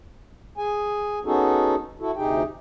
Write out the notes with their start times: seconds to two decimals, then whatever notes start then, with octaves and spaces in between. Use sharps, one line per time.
0.58 G#4 G#5
1.25 B3 C#4 D#4 F#4 G#4 A4
2.00 E4 F#4 A4
2.17 D2 C3 D#4 G4 G#4 G5